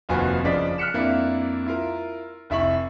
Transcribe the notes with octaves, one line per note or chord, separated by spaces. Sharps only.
F1 D#2 F3 F#4 B4 G#5
F#1 C#3 F3 D5 D#5 B6
F6 F#6 B6 C#7 E7
F2 A#3 D4 E4
E4 F4 A#4
F1 E4 E5 C#6 F#7